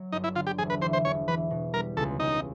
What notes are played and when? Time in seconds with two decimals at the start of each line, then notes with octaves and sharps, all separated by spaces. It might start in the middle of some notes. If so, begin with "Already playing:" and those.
Already playing: F#3
0.12 G1 D#4
0.24 E4
0.35 D3 F4
0.47 G4
0.58 E1 G#4
0.70 B4
0.82 E3 C5
0.93 C5
1.05 E1 C#5
1.27 E3 B4
1.51 B2
1.74 G3 A#4
1.97 C#2 A4
2.20 C#2 D#4